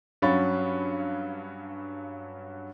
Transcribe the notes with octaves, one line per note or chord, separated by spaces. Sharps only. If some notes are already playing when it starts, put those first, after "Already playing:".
G2 F#3 C#4 F5 B5 A6